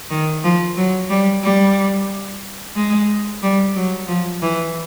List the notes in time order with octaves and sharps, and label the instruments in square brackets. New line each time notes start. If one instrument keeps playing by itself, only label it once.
[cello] D#3
F3
F#3
G3
G3
G#3
G3
F#3
F3
E3